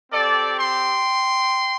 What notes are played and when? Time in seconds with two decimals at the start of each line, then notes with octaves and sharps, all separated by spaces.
0.12 C4 G4 A4 D5
0.59 G5 C6